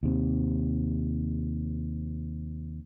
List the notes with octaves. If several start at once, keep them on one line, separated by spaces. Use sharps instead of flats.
D#2 C3